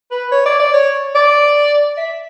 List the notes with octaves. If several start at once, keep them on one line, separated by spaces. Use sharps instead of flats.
B4
C#5
D5
D5
C#5
D5
E5